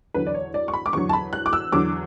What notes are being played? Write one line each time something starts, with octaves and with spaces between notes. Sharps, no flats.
E2 D3 F#3 B4
D5
C#5
D5
C#6
B5
D6
E2 D3 F#3 C#6
A5
B5
F#6
D6
E6
E2 D3 F#3 D6